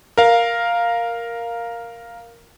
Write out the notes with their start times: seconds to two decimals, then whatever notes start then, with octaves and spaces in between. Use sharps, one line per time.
0.18 A#4 F5